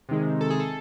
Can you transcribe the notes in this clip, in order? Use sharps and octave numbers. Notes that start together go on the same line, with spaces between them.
C3 D#3 G#3
A4
G#4
A4